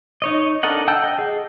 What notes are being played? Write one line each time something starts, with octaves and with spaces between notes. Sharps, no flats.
D#4 C#5 D#5
D4 A4 A#4 D#5 F#5
F#5 G5 A5 E6 G6
D#5
G#4